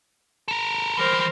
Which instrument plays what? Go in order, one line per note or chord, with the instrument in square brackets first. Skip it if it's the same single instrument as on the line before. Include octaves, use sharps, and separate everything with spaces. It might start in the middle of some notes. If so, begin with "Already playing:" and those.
[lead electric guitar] A4 A#4
[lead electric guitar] E3 G3 [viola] A#4 C5